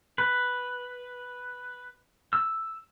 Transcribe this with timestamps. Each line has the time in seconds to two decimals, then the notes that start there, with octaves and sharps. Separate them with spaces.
0.18 B4
2.33 E6